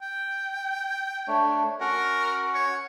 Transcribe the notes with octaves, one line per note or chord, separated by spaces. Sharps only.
G5
A3 D4 C#5
C#4 F#4 A#4 F#5
C#5